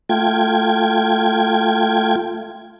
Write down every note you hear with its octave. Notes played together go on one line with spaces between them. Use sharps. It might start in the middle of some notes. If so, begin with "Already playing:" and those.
A3 F4 G5 G#6